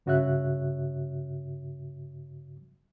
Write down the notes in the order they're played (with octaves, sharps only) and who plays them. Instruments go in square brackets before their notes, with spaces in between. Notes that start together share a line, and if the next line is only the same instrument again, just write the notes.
[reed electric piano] G2 C#3 F#4 C#5 E5 F#6